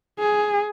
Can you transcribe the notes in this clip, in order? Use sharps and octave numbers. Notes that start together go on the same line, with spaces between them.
G#4